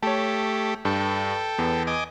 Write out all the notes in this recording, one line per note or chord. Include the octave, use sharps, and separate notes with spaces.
A3 G4 C#5 A5
G2 A4 G5
E2 B3
D#5 G#5 D6